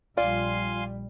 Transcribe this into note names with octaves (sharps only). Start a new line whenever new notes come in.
A#1 G3 F4 D5 F5 G#5 C6